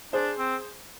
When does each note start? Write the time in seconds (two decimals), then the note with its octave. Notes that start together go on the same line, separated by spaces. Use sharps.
0.13 D4 G#4 C5
0.38 C4